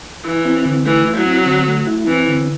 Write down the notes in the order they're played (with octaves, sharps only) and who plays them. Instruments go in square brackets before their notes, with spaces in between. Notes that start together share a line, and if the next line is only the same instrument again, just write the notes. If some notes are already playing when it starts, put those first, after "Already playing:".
[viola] E3 [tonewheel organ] E4
[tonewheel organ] C4
D3
[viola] E3 [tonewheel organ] A3
[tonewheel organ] E4
[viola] F#3
[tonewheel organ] C4
D3
A3
E4
[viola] E3 [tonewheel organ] C4
[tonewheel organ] D3